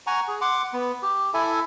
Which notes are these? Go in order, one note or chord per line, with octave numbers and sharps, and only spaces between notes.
F#5 G#5 A#5 C#6
G#4
F#5 C6 D6
B3
G4
E4 A4 E5 G#5